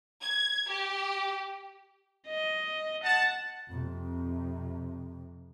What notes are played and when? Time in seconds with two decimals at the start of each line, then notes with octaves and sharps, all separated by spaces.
0.22 G#6
0.69 G4
2.28 D#5
3.04 F#5 A5
3.69 F2 C3